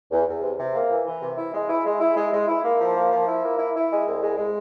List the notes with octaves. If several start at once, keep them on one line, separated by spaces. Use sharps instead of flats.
E2
E2
C3
C3
A#3
E3
E3
C3
E4
G#3
E4
G#3
E4
G#3
G#3
E4
A#3
F3
A#3
F3
E4
A#3
E4
E4
G#3
C2
G#3
G#3